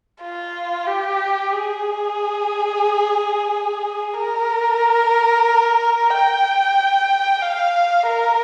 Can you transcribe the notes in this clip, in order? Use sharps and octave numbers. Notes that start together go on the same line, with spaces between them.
F4
G4
G#4
A#4
G5
F5
A#4